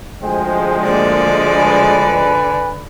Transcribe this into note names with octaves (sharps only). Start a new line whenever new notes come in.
D2 F3 G#3 C5 G5 G#5
D3 A#3 D5
B4 G#5